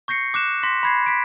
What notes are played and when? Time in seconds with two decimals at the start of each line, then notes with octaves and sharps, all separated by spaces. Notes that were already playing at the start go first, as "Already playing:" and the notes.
0.08 C#6 G6 A#6 C7 C#7
0.34 D6 F#6 E7
0.63 C6 A#6 B6
0.83 B5 G#6 C7
1.06 B6 D7